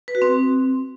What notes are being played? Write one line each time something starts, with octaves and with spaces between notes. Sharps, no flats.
B4
F#4
C4